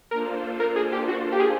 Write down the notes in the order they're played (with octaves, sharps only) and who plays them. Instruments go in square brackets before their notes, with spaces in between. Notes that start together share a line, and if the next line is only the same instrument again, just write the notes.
[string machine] A#3 D4 F4 A4 C5 [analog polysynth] A#4
[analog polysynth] A#4
G#4
G4
F#4
G4
G#4